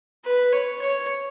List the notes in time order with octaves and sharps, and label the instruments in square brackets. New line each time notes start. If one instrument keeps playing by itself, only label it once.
[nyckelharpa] B4
C#5
C#5